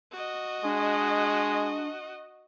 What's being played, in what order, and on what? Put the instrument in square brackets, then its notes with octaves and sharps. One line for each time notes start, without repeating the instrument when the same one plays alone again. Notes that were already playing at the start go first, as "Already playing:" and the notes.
[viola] F#4 D#5
[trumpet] G#3 [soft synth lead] D4